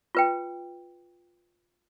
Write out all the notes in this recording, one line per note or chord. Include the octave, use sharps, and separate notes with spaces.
F4 B4 G5